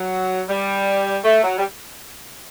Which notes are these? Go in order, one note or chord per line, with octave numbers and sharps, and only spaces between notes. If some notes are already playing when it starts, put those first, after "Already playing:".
Already playing: F#3
G3
A3
F#3
G3